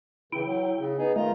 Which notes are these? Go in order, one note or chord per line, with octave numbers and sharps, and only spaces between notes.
C#3 E3 E4 G5
F#3
C#3
B3 D#4 G#4
D#3 G#3 A3 F4 A#5